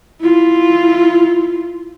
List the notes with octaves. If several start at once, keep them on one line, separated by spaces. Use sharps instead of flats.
E4 F4